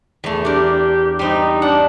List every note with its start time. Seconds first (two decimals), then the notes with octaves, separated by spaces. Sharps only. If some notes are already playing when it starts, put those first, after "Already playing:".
0.24 E2 A3
0.45 D4 G4 A#4
1.19 G3 C4 D#4
1.62 D4 F#5